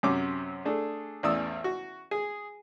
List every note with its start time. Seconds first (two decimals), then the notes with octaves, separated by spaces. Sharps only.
0.03 F#2 C3 C#4 D6
0.65 A3 D4 G#4
1.23 A1 E2 D5 D#6 E6
1.64 F#4
2.11 G#4